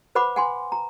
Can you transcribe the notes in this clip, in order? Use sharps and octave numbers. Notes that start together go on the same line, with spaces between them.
B4 C5 F#5 B5 D6
F#5 G#5 C6
A#5